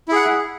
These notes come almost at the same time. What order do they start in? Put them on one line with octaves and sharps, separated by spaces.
E4 G#4 F#5